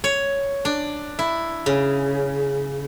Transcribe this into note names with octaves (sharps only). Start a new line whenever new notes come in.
C#5
D4
E4
C#3